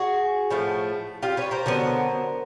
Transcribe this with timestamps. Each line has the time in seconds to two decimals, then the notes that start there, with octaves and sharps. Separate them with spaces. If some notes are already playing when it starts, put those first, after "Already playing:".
Already playing: F#4 G#4
0.50 A2 F3 A3
1.23 F4 G4
1.37 B4 C#5
1.51 A#4 C5
1.66 D3 F#3 B3